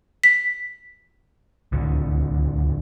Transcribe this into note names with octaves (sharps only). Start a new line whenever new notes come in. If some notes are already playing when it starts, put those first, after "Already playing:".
B6
D1 C#2 D3